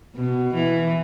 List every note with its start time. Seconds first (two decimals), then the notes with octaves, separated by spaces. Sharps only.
0.15 B2
0.54 E3